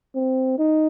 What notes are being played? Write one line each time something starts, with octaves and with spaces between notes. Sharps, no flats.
C4
D#4